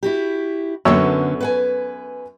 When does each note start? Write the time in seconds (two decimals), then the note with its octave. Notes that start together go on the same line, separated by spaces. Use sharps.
0.03 E4 F#4 G4
0.85 F#2 D3 B3 C#4 C#5 E6
1.41 B4 F#5 G#5